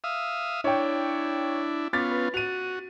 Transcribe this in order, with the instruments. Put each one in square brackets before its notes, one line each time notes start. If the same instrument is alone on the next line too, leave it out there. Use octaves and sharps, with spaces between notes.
[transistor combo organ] E5 F5 D#6
[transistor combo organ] D4 E4 [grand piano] C#5 G5
[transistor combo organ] B3 C#4 F4 [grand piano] D6 A6 B6
[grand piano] B4
[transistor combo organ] F#4 [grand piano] D#7 F7